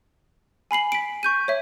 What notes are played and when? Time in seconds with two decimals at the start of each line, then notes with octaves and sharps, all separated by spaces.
0.71 G#5 B5 C7 F#7
0.92 B6 D7
1.23 C#6 G6 D#7
1.48 C#5 E5